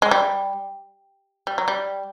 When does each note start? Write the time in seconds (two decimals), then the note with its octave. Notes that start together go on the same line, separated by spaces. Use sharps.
0.02 G#3
0.11 G3
1.47 G3
1.58 F#3
1.68 G3